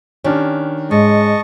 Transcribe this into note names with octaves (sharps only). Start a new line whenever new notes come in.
D#3 C#4 D4 G4
G#2 G#3 D#5 A5 C#6